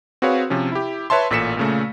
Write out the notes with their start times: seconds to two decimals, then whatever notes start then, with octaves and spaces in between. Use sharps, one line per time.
0.22 C4 F#4 G#4 B4 C#5 F5
0.50 C3 F3 C#4
0.72 E4 G4
1.10 B4 C#5 E5 A5 C6
1.30 A1 A#2 A4 B6 C#7 E7
1.57 A#2 C#3 A3